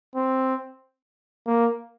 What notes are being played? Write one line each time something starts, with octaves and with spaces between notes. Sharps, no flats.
C4
A#3